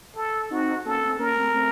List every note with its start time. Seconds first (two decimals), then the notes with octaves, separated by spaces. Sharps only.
0.16 A4
0.50 C4 D#4 F#4
0.85 A#3 C#4 A4
1.02 A3 C4
1.19 A#3 C#4 A#4
1.36 A3 C4
1.53 A3 C4